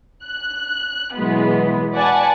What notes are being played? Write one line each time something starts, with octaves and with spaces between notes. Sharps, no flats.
F#6
B2 E3 F#3 G#3 B3
B4 D5 F#5 G#5 A5